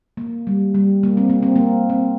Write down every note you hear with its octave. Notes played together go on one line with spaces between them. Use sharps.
A#3
G3
G3
A#3
C4
A#3
C4
A#3
C4